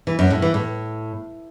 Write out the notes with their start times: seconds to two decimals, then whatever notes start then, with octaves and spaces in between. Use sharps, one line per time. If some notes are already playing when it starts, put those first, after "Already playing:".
0.07 E3
0.19 F#2
0.30 A2
0.42 E3
0.54 A2